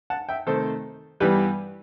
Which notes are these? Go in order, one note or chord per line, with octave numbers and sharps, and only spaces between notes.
F#5 A5
E5 G5
C3 D#3 A3 A4 C5
G2 E3 G3 B3 G4 B4